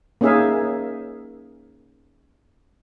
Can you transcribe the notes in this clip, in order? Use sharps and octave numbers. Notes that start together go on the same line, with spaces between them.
A#3 C#4 D#4 G#4 E5 F5